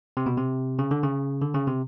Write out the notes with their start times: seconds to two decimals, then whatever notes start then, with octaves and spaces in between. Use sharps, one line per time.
0.17 C3
0.26 B2
0.37 C3
0.79 C#3
0.91 D3
1.03 C#3
1.42 D3
1.54 C#3
1.68 C3